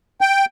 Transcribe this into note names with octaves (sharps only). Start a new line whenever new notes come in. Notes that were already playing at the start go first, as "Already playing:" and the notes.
G5